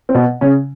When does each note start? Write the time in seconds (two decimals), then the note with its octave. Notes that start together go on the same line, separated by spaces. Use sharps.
0.09 C4
0.15 B2 B3
0.41 C#3 C#4